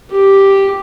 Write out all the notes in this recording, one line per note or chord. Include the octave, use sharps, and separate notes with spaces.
G4